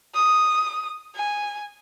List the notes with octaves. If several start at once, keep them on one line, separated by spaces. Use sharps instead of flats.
D#6
G#5